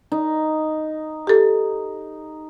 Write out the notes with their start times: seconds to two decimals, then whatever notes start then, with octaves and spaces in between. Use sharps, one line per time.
0.12 D#4
1.27 G4 A4